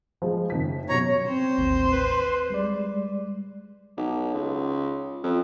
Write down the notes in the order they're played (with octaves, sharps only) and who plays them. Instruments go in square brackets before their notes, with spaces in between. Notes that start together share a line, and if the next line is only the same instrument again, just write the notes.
[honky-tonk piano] F3 G#3
F#1 D#3 B6
[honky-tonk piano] B2 F#3 [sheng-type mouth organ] C#5 A#5
[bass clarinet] C4 [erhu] C5
[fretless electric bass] A1 D#2
[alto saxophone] B4
[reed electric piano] G3 G#3 D5
[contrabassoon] B1
C#2
F2